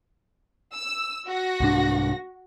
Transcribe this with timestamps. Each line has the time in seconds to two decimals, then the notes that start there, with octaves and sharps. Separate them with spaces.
0.73 E6
1.28 F#4 A#6
1.60 C2 G#2 D4